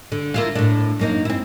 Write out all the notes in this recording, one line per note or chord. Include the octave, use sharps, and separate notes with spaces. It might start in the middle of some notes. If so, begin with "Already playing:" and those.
D3
A#3 E4 F4
A2 D4
F#2 A#3 D#4
C4 E4